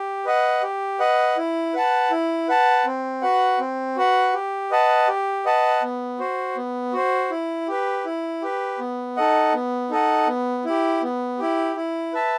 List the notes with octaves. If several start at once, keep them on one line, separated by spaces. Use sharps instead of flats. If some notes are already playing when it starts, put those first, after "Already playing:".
Already playing: G4
B4 D#5 F#5
G4
B4 D#5 F#5
E4
B4 F#5 A5
E4
B4 F#5 A5
C4
F#4 B4 F#5
C4
F#4 B4 F#5
G4
B4 D#5 F#5 A5
G4
B4 D#5 F#5 A5
B3
F#4 C5
B3
F#4 C5
E4
G4 B4
E4
G4 B4
B3
D#4 A4 D#5 F#5
B3
D#4 A4 D#5 F#5
B3
E4 G4
B3
E4 G4
E4
B4 E5 A5